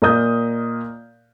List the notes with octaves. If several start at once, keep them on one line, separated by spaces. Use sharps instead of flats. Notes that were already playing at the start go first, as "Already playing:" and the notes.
A#2 A#4 D#5 D#6 G6